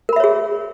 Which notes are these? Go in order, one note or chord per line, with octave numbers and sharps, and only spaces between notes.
G#4 A#4 C#5 E5 B5